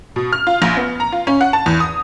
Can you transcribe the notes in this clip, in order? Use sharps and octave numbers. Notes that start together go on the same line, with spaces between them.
B2
F6
F4
A#1
B3
A#5
F4
C#4
F#5
A5
E2
D#6